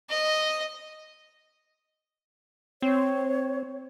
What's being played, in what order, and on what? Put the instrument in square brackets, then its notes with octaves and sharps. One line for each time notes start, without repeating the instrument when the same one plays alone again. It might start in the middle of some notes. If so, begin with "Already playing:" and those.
[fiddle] D#5
[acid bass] C4 [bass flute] C#5